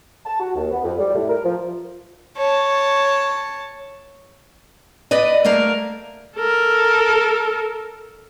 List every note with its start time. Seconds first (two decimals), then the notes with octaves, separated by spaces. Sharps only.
0.26 A5
0.40 F#4
0.55 D#2
0.71 B3
0.83 F2
0.98 G3
1.14 A2
1.28 A#4
1.44 F3
2.37 C#5 A5
5.11 B4 D5 D#5
5.45 A3 A#3 A#4 F5
6.36 A4 A#4